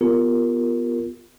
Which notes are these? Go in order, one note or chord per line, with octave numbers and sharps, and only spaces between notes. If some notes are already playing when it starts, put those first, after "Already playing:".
B3 F4 G4 A#4